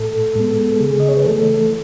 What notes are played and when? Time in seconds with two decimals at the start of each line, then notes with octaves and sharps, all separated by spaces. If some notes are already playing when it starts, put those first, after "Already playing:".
Already playing: A2 A4
0.35 G#3 B3
0.80 C#3 G#4
1.00 D#5
1.08 C#5
1.17 B4
1.26 E3 A3 A4